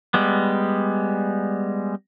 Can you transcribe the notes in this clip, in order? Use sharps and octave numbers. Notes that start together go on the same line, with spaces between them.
G3 G#3 B3